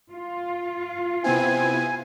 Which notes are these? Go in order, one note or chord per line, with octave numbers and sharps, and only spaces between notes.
F4
C3 B3 C4 E4 G#5